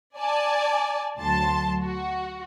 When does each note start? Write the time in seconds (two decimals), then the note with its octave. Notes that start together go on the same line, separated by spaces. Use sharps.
0.17 D5 G#5 A5
1.18 D2 F#3 A5 C6
1.83 F#4